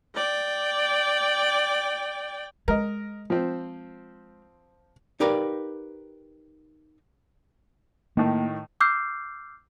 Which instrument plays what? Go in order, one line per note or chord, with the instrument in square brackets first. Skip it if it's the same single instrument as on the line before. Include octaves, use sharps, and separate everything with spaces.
[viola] D5 G5
[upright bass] G#3 [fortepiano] A#4 D#5
[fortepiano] F3 C4
[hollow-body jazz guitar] D#4 G4 A#4 B4 D5 F5
[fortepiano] A2 D#3 [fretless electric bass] A#3
[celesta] D6 E6 F6 G6 C7